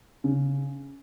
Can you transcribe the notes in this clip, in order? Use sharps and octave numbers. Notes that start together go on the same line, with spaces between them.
C#3